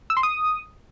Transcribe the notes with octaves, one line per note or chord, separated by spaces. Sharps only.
E6
C6
D#6